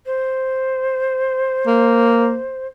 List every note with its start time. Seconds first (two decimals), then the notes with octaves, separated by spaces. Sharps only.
0.06 C5
1.67 A#3